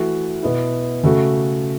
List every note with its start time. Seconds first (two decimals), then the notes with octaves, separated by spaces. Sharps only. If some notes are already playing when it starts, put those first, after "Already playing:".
Already playing: E3 A3 F#4
0.43 B2 B3 E4
1.03 C#3 A3 F#4